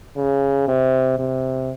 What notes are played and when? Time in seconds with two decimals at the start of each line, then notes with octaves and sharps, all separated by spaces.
0.17 C#3
0.68 C3
1.19 C3